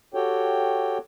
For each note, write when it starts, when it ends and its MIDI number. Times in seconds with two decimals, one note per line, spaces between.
0.14 0.98 66
0.14 0.98 67
0.14 0.98 69
0.14 0.98 73
0.14 0.98 79